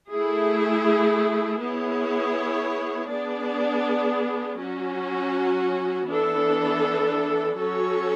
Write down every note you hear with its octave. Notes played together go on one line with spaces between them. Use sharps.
A3 E4 G#4
B3 E4 G#4 C#5
B3 D4 G#4 D5
F#3 C#4 F#4
E3 B3 D4 A4
F#3 C#4 F#4 A4 C#5